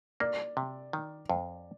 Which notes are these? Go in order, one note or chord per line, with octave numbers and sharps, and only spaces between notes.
A#3 D5
C3
D#3
F2